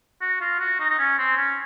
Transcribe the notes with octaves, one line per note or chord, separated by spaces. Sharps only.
F#4
F4
F#4
D#4
D#4
C#4
C4
C#4